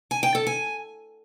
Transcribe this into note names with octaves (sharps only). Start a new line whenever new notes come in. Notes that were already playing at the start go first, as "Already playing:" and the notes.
G#5
G5
A4
G#5